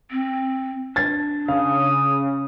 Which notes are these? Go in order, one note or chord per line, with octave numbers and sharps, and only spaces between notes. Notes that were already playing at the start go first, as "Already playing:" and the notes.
C4
D4 G#6 A6
C#3 F5 D#6